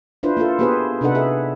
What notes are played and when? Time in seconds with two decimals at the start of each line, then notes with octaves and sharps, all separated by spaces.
0.23 D4 E4 F4 B4 C5
0.37 A#3 E4 F4 A4
0.59 A#3 B3 G4 G#4 B4 C5
1.01 C3 D4 D#4 A4 B4 F#5
1.15 G#4 A4 E5